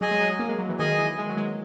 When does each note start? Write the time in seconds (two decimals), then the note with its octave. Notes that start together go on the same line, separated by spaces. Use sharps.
0.01 F#3 G#4 D#5 G#5
0.11 G#3
0.21 F#3
0.39 A#3
0.48 G#3
0.59 F#3
0.69 E3
0.79 D#3 G#4 D#5 G#5
0.98 E3
1.18 G#3
1.29 F#3
1.37 G#3